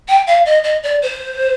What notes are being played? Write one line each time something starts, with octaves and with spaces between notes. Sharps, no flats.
G5
F5
D#5
D#5
D5
C5